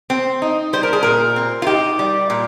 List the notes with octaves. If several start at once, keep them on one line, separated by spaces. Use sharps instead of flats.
C4
D#4
G3 C5
A#4
G#4
A#2 A#4
C4
F4
D#4 G4
G3
A#2